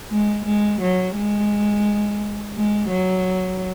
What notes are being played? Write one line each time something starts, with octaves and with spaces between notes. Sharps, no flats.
G#3
G#3
F#3
G#3
G#3
F#3